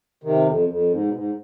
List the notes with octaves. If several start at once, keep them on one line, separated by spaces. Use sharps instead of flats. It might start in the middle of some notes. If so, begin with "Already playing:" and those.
C3 D#3
F2
F2
G#2
B2
G#2